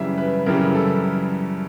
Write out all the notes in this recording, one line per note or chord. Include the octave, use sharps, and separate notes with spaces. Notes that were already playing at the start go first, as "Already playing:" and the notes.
Already playing: F#2 C#3 E3 G3 E5
B4
F#2 C#3 E3 G3 A#4
A4